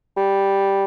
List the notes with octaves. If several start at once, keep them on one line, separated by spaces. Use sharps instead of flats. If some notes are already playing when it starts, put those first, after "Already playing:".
G3